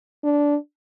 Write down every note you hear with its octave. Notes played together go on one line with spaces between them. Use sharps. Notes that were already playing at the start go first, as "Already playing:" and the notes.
D4